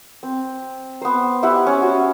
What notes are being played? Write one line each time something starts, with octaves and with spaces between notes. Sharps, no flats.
C4
B3 C5
E4 G4 E5 F#5
C#4
F#4